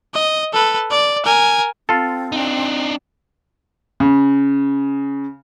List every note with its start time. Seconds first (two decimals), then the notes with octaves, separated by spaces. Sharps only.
0.14 D#5
0.53 A4 B4
0.91 D5
1.25 A#4 G#5
1.89 C4 F4 A4
2.32 D4 D#4
4.00 C#3